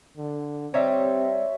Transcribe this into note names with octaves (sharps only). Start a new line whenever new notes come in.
D3
G3 C4 D#4 G4 C#5 E5